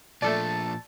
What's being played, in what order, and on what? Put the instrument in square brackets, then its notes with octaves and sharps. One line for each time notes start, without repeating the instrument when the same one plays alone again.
[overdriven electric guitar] A#2 F3 [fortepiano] A3 A4 D5 [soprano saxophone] A5